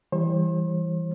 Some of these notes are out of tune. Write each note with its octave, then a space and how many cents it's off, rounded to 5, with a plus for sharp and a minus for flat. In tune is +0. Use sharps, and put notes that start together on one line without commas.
E3 +0 G3 +0 C5 +40